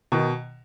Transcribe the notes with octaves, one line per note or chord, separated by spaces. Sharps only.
B2 D#3